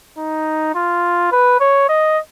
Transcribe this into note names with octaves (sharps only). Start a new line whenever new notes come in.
D#4
F4
B4
C#5
D#5